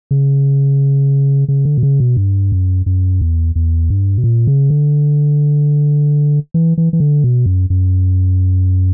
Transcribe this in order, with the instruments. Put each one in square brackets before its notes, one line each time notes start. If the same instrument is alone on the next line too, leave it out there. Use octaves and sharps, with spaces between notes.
[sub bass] C#3
C#3
D3
B2
C#3
B2
G2
F#2
F#2
E2
E2
G2
B2
A#2
C#3
D3
E3
E3
E3
D3
B2
F#2
F#2